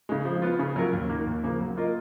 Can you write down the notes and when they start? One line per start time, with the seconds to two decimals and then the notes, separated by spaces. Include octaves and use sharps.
0.09 C#3 G#3
0.25 F3
0.42 B3 F4
0.59 C#3
0.76 F#3 C#4 F4 A#4
0.93 D#2
1.09 D#3 A#3
1.27 D#2
1.44 C#3 F3 A#3
1.61 F#3
1.77 A#3 F4 A#4 D#5